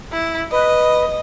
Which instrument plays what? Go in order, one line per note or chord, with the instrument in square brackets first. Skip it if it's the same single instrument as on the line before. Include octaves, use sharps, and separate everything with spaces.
[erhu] E4
[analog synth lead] B4 [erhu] D#5